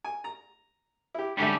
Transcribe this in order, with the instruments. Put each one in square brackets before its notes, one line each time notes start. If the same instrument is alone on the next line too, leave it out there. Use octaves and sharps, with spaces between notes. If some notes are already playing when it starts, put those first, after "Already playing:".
[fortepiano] G#5
A#5
E4 G4
[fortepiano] G#2 D3 A3 [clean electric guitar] G3 C#4 G4